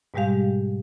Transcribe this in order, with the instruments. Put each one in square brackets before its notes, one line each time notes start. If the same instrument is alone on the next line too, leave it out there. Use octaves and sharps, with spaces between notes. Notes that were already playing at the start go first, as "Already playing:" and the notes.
[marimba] G#2 B2 G3 G#3 G4 F5